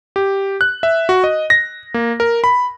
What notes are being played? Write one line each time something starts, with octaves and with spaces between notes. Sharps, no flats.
G4
F#6
E5
F#4
D#5
A#6
A#3
A#4
B5